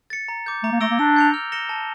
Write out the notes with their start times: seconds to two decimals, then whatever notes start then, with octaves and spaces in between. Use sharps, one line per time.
0.10 A6 C#7
0.28 A#5
0.46 D6 G6
0.63 A3 A#5
0.72 A#3
0.81 A3 E6 A#6 D7 G7
0.91 A#3
0.99 D4 E6
1.16 G6 C#7 F7
1.34 F6
1.52 A#6 C#7 E7 G7
1.69 A5